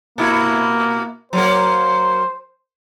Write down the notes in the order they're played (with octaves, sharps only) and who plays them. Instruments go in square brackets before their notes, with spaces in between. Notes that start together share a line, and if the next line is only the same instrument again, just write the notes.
[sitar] B2 E4 F#4 [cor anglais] A#3
[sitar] F#3 A#3 A#4 [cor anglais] C5